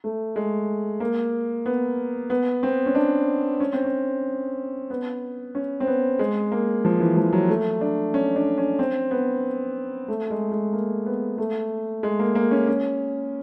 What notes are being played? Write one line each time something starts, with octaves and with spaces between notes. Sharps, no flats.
A3
G#3
A#3
B3
B3
C4
C#4
D4
C#4
C4
C#4
B3
C#4
C4
B3
G#3
A#3
F3
E3
F3
F#3
A3
D4
C#4
D4
C#4
C4
B3
A3
G#3
G#3
A#3
B3
A3
G#3
A#3
A#3
C#4
C#4